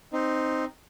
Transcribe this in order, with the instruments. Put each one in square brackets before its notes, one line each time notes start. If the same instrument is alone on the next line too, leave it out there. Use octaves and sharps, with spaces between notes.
[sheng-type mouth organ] C4 D#4